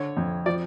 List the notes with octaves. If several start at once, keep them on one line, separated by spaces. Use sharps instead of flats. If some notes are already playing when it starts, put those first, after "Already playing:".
Already playing: D3 C#5
F2
F3 D5